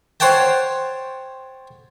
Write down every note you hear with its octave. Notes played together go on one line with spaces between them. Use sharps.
C5 C#5 F#5 G5 A5